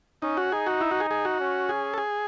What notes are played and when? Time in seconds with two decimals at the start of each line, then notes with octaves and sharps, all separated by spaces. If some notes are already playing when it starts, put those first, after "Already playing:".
0.22 C#4 D#4
0.37 F#4
0.52 D#4 G#4
0.66 F#4
0.81 E4
0.91 F#4
1.00 G#4
1.11 G#4
1.25 F#4
1.40 C#4
1.69 G#4
1.94 A4
1.98 G#4